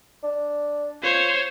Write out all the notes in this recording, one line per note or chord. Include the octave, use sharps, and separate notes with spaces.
D4
F4 C5 C#5